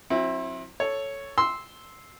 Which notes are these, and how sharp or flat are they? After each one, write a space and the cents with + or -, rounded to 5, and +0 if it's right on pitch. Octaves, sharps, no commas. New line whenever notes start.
F#3 -40 C4 +30 E4 -10
A4 +0 C#5 +0
C6 +0 E6 -10